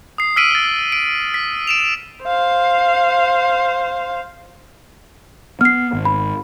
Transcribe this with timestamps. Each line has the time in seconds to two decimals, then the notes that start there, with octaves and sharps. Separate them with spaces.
0.18 D#6 C7
0.36 E6 F6 B6 D7 D#7 F#7
0.51 A6 C7 G7
0.92 D7
1.34 B6
1.67 D7 E7 F7
2.24 C5 F5
5.61 B3 F6 C7
5.93 G#1
6.05 B5